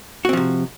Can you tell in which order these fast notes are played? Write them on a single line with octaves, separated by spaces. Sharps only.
F#4 C4 F3 C3